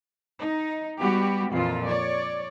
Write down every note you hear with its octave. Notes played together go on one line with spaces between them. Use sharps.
D#4
G3 B3 F#4 G4
F2 A#2 E3 F4
C#5 D5